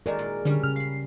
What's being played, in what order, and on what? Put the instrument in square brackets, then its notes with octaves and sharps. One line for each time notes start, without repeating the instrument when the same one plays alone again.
[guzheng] D#3 G#3 F#4 [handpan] A#4 D5
[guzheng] A#2 G#3
[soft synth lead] D3 [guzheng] G3 C#4
[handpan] C#3 [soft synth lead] F6
[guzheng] F5 B5 [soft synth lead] C7